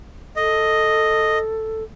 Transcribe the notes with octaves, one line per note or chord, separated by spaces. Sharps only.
A4 D#5